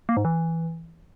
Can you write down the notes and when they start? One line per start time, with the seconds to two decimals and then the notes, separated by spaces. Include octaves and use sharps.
0.09 A#3
0.17 G#2
0.25 E3